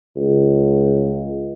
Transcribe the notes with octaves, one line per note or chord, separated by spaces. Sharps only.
C#2